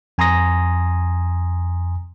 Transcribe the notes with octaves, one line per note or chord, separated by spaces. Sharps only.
F2 G#5 A#5 C6 D#6 A#6